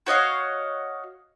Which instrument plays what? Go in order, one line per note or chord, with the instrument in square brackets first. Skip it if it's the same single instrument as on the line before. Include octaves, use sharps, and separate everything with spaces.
[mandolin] F#4 C#5 D#5 F5